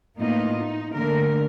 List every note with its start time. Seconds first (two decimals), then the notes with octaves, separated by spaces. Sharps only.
0.20 A2 A#3 B3 D#4 F4 D#5
0.61 D#4
0.94 D3 A3 A#3 A#4